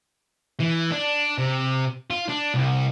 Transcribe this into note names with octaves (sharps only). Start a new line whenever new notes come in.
E3
D4
C3
F4
D4
C2